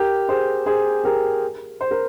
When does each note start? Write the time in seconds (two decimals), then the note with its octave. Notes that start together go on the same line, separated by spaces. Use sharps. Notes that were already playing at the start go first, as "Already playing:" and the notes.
Already playing: G4 A#4
0.28 G#4 C5
0.66 G#4 C5
1.04 G4 A#4
1.81 C5
1.91 A#4